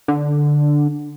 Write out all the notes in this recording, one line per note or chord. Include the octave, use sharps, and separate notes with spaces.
D3